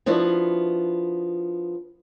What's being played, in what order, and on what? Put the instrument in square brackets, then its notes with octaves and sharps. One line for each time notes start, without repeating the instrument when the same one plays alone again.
[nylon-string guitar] F3 B3 D4 E4 F#4